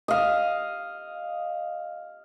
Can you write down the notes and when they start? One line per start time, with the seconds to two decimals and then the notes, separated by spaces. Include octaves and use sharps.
0.08 D#5 F5